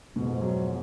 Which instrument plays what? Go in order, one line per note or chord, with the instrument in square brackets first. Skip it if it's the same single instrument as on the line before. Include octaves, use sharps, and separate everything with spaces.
[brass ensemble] F2 G#2 [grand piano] B2
[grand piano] F#3